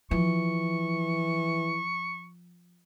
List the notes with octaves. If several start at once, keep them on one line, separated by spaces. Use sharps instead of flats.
E3 F3 C#6